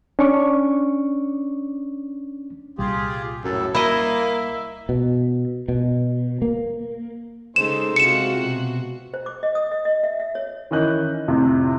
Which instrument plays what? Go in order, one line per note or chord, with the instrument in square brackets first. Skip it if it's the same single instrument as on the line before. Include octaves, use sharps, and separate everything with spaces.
[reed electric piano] C#4 D4 C#6 D6
[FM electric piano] C2 A#2 G3 [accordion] F4 G4 G#4
[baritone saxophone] F#2 [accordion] A2 C#3 A4
[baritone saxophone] A#3 [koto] E4 D#5 [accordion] E5
[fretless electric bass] B2
B2
A#3
[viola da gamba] C#3 G#3 A4 [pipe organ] D#4 G#4 C5 [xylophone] E7
[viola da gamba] C3 F#4 [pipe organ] G#3 F4 [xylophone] C#7 E7
[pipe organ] B2
[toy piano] C5
D6
D#5
D#6
D#5
D#5
E5
E5
C#5
[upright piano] D#3 E3 C#4 D#5 F#6 G6
F2 A2 C3